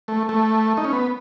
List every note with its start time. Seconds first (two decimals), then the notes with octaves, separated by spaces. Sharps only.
0.08 A3
0.29 A3
0.77 D#4
0.84 C#4
0.93 B3